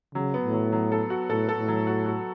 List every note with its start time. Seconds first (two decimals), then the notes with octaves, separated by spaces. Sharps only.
0.15 C#3 F#3
0.34 B3
0.44 A2
0.53 F#3
0.72 F#3
0.92 A4
1.10 F#4
1.30 A2 A4
1.49 A4
1.59 A2
1.68 F#3
1.87 F#4
2.06 F#4